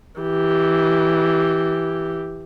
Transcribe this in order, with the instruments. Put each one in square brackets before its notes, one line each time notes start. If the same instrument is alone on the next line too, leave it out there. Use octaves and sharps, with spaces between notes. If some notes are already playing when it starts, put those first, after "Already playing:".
[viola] E3 G4